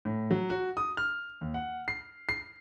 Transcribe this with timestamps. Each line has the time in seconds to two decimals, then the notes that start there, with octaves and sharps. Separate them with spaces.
0.05 A2
0.31 F#3
0.50 F#4
0.77 D#6
0.97 F6
1.41 D#2
1.54 F#5
1.88 C7
2.29 C7